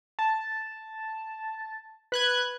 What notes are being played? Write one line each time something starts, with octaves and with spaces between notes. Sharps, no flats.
A5
B4 F#6 G#6